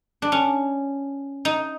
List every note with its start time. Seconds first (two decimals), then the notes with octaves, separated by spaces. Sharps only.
0.22 D4
0.32 C#4
1.45 D#4